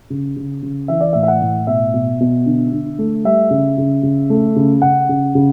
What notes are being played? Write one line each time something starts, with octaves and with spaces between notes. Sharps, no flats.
C#3
C#3
C#3
E3 E5
D5
A2 E5
E5
F#5
A2
B2 E5
B2
B2
D3
D3
A3
G3 E5
C#3
C#3
C#3
A3
C#3
C#3 F#5
C#3
C#3